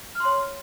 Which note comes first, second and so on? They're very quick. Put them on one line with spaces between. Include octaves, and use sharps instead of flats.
F6 C6 C#5